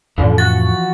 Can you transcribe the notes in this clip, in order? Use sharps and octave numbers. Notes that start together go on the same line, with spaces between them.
F2 A2 D3 E3 F3 C#4
F#4 A6